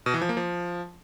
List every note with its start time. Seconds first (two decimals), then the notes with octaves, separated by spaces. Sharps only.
0.06 B2
0.14 E3
0.21 F3
0.29 A#3
0.37 F3